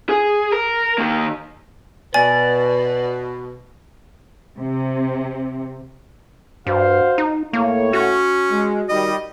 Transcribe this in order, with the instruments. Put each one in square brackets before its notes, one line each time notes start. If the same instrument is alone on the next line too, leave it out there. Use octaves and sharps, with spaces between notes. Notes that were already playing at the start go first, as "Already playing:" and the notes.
[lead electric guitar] G#4
A#4
D#3 A#3
[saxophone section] B2 [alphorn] B4 [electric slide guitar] D5 [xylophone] G#5
[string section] C3
[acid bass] G2 [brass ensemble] F#4 C5 F5
[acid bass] D#4
[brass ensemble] A2 C#5 [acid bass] A#3
[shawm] C#4 [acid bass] F#4
[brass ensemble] G#3
[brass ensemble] D#3 G3 [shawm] D#5